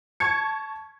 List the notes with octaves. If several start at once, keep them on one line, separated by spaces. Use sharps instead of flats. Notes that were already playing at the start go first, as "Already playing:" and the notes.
A5 C#6 G#6 C#7